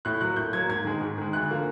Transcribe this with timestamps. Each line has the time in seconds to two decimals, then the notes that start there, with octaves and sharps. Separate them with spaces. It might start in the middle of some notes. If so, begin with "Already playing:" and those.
0.05 A2 F#6
0.21 F#3 A#3 F#6
0.36 A2 G6
0.53 F#3 A#3 G#6
0.69 G#2 G#6
0.85 D#3 G#3
1.01 G#2
1.18 D#3 G#3
1.33 D2 F#6
1.49 D3 F3 A#3